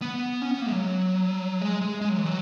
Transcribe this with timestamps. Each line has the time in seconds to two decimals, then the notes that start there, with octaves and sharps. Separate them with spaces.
0.02 B3
0.41 C#4
0.51 B3
0.61 A#3
0.67 G#3
0.72 F#3
1.62 G#3
1.81 G#3
2.01 G#3
2.09 F#3
2.17 E3
2.26 F#3